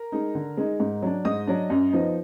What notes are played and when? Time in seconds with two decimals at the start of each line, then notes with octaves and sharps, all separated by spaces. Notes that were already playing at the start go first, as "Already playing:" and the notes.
Already playing: A#4 A#5
0.12 G#3 D#4
0.35 D3
0.57 G#3 D#4
0.80 G#2
1.02 F#3 D4
1.25 G#2 D#5 D#6
1.47 F#3 D4
1.70 F#2
1.92 F3 B3 D#4